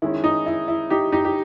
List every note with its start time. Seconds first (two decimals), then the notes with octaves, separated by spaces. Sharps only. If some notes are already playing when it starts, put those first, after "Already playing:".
0.02 D#3 G#3 C#4 E4
0.24 D#4
0.46 E4
0.68 E4
0.90 D#4 G4
1.12 D#4 G4
1.25 G4